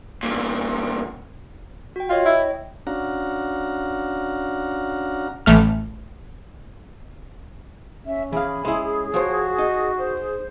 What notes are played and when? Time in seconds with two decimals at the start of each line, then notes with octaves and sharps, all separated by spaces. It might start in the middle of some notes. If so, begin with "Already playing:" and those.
0.23 E2 A#2
1.96 F#4 G5
2.09 F4 C#5 D#5 G5
2.25 E4
2.87 C#4 D4 F#4 F5 F#5 A#5
5.46 A1 A3 F6
8.07 C#4 E5
8.33 E3 G#4 F5 B5
8.65 G#3 C#4 E4
9.14 F3 F#4 C5 C#5
9.58 D#4 D#5
9.98 C5